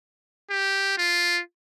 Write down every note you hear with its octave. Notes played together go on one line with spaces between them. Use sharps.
G4
F4